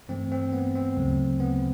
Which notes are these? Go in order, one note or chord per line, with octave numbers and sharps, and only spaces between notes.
G2 E3 A3 C4
C4
B3
C4
D2 C#3 F#3 A3
B3